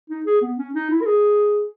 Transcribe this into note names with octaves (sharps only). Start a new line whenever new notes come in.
D#4
G#4
B3
C#4
D#4
E4
A#4
G#4